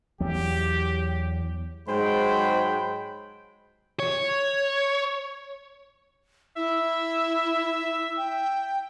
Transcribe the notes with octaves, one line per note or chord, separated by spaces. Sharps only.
E2 F#3 G4
G#2 F#3 G#3 C5 G5 B5
C#5
E4 E5
G5